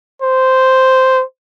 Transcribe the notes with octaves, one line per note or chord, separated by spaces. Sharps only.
C5